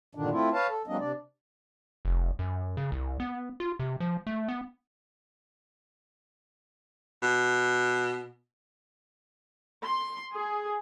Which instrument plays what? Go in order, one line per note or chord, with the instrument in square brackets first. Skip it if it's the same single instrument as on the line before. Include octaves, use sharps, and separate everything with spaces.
[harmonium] G2 A#2 D3 D#3 D4
A3 C4 E4 F4
B4 C#5 F5 A5
A4
F#3 G#3 A#3 C4 D4 D#5
C3 D4 D5
[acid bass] F1
F#2
C#3
C2
B3
F4
C3
F3
A3
B3
[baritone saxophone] B2
[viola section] C6
G#4